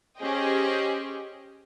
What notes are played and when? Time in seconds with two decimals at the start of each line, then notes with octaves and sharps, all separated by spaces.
0.18 C#4 G4 G#4 C5 D#5 G5